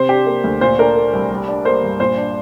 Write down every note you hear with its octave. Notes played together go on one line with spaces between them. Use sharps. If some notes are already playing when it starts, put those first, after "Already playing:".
Already playing: C3 C5
D4 G4
A#3
D2
A#2 C5
D4 A#4
A#3
C2
G3
D4
A#3 C5
G2
A#2 C5
D4